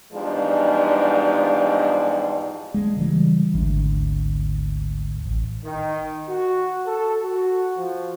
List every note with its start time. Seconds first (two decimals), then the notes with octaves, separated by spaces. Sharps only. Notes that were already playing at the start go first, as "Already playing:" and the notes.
0.13 E2 G#2 F3 G3 G#3 D4
2.74 G#3
2.96 C#3 E3 G3
3.54 G#1 D2
5.26 A1
5.64 D#3
6.29 F#4
6.87 A4
7.25 F#4
7.77 F3